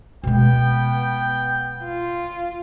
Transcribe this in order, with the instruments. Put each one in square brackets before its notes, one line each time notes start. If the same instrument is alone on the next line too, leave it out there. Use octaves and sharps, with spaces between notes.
[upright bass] B2 G#3 [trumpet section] B3 G5
[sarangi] F4